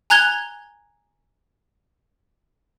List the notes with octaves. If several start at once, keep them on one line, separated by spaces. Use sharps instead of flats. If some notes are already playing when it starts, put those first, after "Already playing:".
G#5 A#5 F#6 G#6 F7 G7